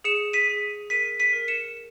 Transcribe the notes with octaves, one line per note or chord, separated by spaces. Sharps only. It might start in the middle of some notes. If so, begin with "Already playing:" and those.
G#4 C#7 E7
B6 D#7
G#4
A#4 B6 D#7
B6 D#7
A#4
C#7 E7